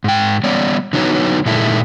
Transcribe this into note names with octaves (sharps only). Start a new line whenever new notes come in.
G#2 G5
G3 B3 C#5 D5
D3 F#3 B3 D#4 C#5 A#5
A#2 D#3 G#3 A#3 E4 A4